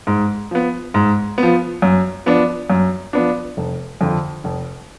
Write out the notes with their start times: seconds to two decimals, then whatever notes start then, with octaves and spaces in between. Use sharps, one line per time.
0.07 G#2
0.51 F3 B3
0.94 G#2
1.38 F3 B3
1.82 F#2
2.26 F3 B3 D4
2.70 F#2
3.13 F3 B3 D4
3.57 F1
4.01 F2 D3 F3
4.44 F1